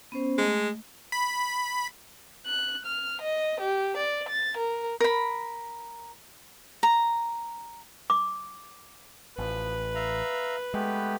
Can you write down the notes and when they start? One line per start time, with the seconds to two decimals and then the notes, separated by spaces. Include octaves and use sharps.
0.12 B3 C#4 C5
0.38 G#3 A3 D#5
1.12 B5
2.46 F#6
2.85 F6
3.21 D#5
3.60 G4
3.97 D5
4.29 A6
4.57 A#4
5.00 A#4 B5
6.83 A#5
8.10 D6
9.38 A1 F3 B4
9.95 E5 F5 A#5
10.74 G#3 A3 B3 G4